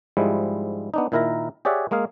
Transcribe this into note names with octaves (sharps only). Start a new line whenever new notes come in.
G#2 F3 G3 G#3 E4
B3 D4 D#4
A#2 D#3 E4 A#4 E5 A#5
G4 G#4 C#5 D5 E5 F#5
G#3 A#3 G#4 F5